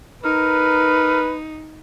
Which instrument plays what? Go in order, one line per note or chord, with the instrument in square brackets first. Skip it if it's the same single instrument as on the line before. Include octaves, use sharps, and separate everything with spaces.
[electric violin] D#4 [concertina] A#4 [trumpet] B4